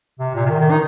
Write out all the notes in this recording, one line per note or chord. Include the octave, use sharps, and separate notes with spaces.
C3
A#2
C3
D#3
D#3
D#4